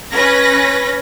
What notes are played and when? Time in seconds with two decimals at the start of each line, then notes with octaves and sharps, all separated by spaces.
0.16 C#4 B4 A#6